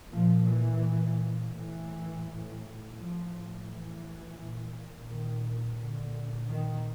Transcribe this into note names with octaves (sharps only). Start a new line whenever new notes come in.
A#2 F3
E3
A2 E3
A2 F3
E3
A#2
D#3
A#2 D3
D#3